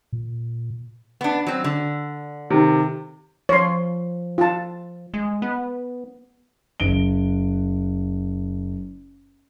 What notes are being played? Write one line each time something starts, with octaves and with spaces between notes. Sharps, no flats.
A#2
B3 D4
F#3 C4
D3
C3 D#3
F3 C#5 C6
F4 A5
G#3
B3
F#1 D7 G7